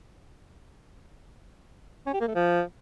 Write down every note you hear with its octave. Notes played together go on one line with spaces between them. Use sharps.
C#4
G4
A#3
A3
F3